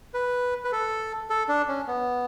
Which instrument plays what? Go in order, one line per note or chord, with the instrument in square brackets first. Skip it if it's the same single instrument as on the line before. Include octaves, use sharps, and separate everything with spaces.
[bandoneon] B4
B4
A4
A4
D4
C#4
B3